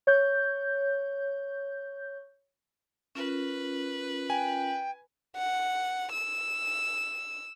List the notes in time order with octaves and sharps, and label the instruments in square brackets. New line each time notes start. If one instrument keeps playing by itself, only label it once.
[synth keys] C#5 G6
[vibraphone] C#4 F4 A#4 [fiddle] B4
[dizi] G5 [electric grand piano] G#5
[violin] F#5
E6